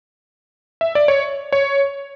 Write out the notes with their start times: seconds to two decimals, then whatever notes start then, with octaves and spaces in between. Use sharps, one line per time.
0.81 E5
0.95 D5
1.08 C#5
1.52 C#5